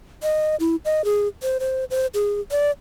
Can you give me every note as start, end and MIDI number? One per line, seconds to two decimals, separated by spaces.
0.23 0.56 75
0.60 0.76 64
0.85 1.05 75
1.05 1.28 68
1.43 1.58 72
1.60 1.85 72
1.91 2.06 72
2.14 2.40 68
2.51 2.71 74